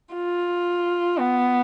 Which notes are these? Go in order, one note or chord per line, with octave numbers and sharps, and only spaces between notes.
F4
B3